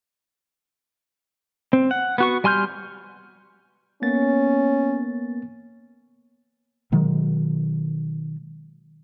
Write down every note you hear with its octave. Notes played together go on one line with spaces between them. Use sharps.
C4
F#5
B3 F#4 C#6
G3 G#5 C6 F6 G6
A#3 B3 C#4 A6
B2 D#3 F#3 G#3